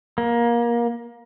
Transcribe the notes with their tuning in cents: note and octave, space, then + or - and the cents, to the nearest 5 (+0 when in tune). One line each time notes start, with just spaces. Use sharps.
A#3 +20